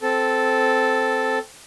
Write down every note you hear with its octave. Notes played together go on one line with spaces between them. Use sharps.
C4 A4